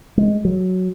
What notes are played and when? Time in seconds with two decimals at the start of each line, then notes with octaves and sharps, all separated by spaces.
0.18 G#3
0.45 F#3